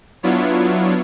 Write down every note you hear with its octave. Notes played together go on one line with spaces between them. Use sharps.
F#3 B3 D4 E4 F4 C#5